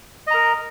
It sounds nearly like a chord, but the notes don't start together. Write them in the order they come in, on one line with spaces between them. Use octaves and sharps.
D#5 A#5 A#4